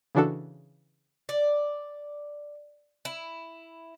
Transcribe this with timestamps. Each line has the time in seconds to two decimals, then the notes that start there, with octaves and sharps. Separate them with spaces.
0.15 C#3 E3 D4 F#4 A4
1.29 D5
3.05 E4